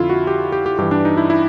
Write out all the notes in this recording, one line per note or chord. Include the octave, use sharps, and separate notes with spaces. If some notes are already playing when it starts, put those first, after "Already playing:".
Already playing: F2 D3 E4 F4
F#4
G4
G4
G4
G2 E3 G4
D4
D#4
E4
E4